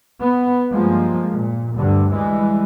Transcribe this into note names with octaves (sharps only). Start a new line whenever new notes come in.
B3
G2 F3 G#3 A#3
A#2
D2 G2 D3
E3 G3 G#3